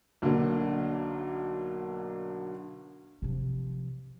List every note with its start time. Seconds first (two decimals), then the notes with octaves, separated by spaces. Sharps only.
0.22 B1 D3 F#3 A#3
3.22 C3 F3